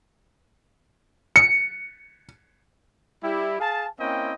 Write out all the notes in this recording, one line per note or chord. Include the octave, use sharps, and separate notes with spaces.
C#7
G3 E4 G4
G#4 F5 G#5 A5
A#3 C4 C#4 E4 D#5 G5